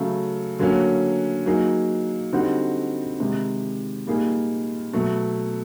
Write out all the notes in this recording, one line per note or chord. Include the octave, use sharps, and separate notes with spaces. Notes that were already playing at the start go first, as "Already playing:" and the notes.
Already playing: C#3 F#3 A3
D3 F#3 A#3 C#4
F#3 A#3 D#4 G#4
D3 G3 C4 D#4 F#4
C3 D#3 G#3
A#2 G3 A#3 D#4 G#4
B2 F#3 A3